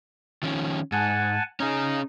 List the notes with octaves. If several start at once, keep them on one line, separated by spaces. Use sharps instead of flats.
D#3 F3 C#4
G#2 F#5 G#5 A5
C#4 D#4 G#4